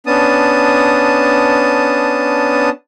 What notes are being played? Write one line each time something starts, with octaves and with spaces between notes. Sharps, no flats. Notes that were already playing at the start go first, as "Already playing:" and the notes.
B3 C#4 D4 A5 D#6